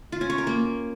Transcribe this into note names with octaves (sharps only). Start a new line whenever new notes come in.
F4
C#4
C#5
A#4
A#3